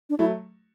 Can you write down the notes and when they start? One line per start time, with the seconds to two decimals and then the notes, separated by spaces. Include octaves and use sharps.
0.10 D4
0.19 F#3 A3 E4